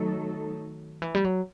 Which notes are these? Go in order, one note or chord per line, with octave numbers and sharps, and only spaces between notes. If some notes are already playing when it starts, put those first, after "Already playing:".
Already playing: D#3 F#3 A3 D#4 A4
E3
G3
F#3